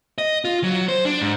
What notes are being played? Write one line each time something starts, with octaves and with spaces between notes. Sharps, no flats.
D#5
F4
F#3
C5
D4
G#2